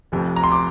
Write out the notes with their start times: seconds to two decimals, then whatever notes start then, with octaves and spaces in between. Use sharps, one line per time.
0.12 F1 F2 C3
0.36 A#5
0.44 C6
0.52 D6